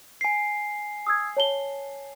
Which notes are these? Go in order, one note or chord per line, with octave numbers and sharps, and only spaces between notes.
G#5 C7
D#6 E6 G#6
C#5 A5 G7